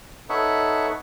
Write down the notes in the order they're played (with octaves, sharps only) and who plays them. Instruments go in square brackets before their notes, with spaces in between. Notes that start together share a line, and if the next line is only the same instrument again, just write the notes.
[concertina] D#4 A4 B4 C#5 E5 F#5